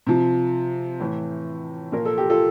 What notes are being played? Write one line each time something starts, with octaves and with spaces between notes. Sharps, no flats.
C3 F3
A2 E3
A#2 F3 A#4
A4
G4
F4 A4